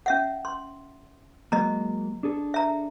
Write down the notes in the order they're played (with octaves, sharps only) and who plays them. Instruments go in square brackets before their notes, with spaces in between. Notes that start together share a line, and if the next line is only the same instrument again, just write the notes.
[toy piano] C#4 E5 F#5
C6
[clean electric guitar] F#3 G#3 A#3 [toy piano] D#5 A#5
[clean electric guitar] D4 G#4 A4
[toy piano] E5 A#5